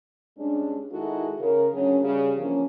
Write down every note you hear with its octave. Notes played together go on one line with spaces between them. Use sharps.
G2 G#3 C#4 D4
D#3 G#3 D#4 E4 F#4 A4
C#3 A#4
D2 C#3 F#3 C#4
C#3 G3
E2 G2 F3 A#3 C#4